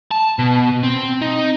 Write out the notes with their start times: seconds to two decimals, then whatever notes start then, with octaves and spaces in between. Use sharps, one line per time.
0.11 A5
0.39 B2
0.83 C4
1.22 D#4